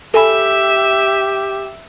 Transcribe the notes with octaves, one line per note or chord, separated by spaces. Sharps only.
G4 A4 E5 G#5 B5